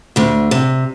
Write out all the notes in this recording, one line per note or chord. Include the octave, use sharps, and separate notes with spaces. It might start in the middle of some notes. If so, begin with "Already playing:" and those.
D2 D3
C3